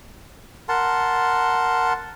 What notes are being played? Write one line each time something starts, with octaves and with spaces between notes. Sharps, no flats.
A#4 F#5 A5 C6